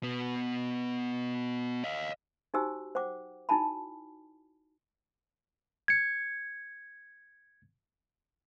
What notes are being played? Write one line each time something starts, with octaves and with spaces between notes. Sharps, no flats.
B2 B3
D#5 F5
D#4 F#4 G4 C5 G#5 E6
C5 F#5 G5 D6
D#4 E4 F#4 G#5 A5 B5
G#6 C#7